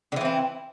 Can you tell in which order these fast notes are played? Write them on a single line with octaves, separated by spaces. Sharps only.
D3 E3 C4 E4